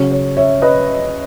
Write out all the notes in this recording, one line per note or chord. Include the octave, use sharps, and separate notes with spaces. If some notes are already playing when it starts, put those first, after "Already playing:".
Already playing: C#3 F#3 C#4
C#5
C#5 E5
B4 D#5